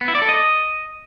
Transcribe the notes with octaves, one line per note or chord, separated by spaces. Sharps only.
B3
E4
D5
A4
D#5